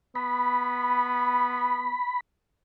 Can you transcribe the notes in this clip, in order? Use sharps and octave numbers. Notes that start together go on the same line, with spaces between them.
B3 B5